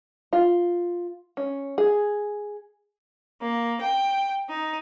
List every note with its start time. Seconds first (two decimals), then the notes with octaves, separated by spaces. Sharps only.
0.33 F4
1.37 C#4
1.78 G#4
3.41 A#3
3.80 G5
4.49 D#4